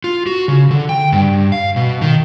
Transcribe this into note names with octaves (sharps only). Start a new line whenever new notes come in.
F4
F#4
C#3
D3
G5
G2
F5
B2
D#3